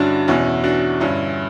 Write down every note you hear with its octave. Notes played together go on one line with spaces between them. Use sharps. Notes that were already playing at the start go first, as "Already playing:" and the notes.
Already playing: G2 D3 C#4 D4 E4 F#4
E2 B2 C#4 E4
D4 F#4
G2 D3 C#4 E4